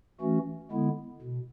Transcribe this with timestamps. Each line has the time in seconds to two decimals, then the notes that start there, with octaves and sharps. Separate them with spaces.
0.21 E3 A3 C#4 F#4
0.71 D3 G#3 B3 E4
1.22 B2